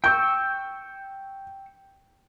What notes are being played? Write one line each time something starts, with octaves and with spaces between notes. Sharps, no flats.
G5 C#6 E6 G6